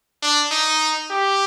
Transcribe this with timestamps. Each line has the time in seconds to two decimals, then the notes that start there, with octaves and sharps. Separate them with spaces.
0.23 D4
0.51 D#4
1.11 G4